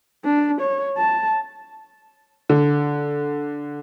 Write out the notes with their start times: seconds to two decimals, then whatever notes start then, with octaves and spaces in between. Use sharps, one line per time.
0.25 D4
0.61 C#5
0.97 A5
2.49 D3